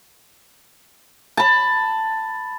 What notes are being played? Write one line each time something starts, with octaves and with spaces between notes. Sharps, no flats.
A5 B5